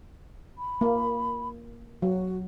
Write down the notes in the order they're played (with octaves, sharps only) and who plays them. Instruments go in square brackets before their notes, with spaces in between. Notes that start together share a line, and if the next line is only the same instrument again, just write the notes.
[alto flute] B5
[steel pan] A#3
[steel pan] F#3 [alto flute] F#4